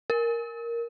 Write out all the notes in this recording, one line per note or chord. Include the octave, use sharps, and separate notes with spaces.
A#4